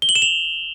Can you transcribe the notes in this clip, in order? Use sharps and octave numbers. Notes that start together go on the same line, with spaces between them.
G7
F#7
E7
F7